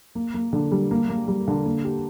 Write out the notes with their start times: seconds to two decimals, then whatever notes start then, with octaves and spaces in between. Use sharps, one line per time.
0.15 A#3
0.34 A#3
0.53 D3
0.72 G3
0.91 A#3
1.09 A#3
1.28 G3
1.48 D3
1.66 A#3
1.85 G4